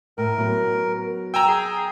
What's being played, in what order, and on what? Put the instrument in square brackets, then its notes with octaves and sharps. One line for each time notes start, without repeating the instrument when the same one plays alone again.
[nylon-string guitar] A2 [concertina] A#4
[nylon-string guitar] F#3 B3
[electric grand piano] G5 G#5 A#5 [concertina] E6
[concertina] G#4